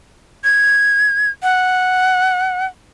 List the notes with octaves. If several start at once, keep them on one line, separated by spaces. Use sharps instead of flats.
G#6
F#5